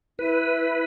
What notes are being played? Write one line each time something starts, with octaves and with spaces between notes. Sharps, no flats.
E4 B4